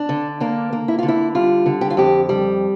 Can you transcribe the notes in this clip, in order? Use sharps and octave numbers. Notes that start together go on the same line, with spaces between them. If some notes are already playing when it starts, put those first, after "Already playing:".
Already playing: D4
D3
A#3 D4
A#3
E4
D3 F4
E4
G3 F4
D3
G4
F4
F2 G4
G3